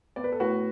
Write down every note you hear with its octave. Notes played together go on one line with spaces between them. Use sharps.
B3 D5
B4
A4
A2 F#4 B4